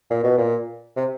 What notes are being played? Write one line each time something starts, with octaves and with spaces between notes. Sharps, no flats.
A#2
B2
A#2
C3